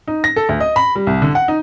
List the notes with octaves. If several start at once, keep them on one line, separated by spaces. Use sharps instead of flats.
D#4
A#6
A4
D2
D#5
B5
G3
C2
D3
F#5
D#4